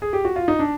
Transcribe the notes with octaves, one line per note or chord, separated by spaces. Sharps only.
G#4
G4
F#4
F4
D#4
D4